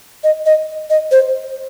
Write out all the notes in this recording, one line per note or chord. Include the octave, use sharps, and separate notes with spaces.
D#5
D#5
D#5
C5